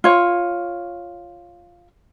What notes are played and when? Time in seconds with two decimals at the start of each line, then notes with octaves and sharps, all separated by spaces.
0.04 F4 C#5